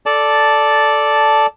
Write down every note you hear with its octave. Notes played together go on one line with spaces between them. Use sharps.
A4 D5 A5